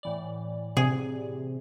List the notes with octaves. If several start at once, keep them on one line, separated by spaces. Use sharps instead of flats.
A2 E3 D5
C3 G#4